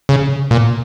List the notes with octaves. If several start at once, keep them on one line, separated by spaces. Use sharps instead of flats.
C#3
A#2